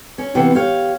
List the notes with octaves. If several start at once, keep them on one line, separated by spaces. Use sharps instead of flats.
C#4
C3 E3 B3
G4 C#5 F5